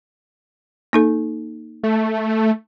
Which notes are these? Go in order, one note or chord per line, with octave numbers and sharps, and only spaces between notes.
A#3 D#4 A4
A3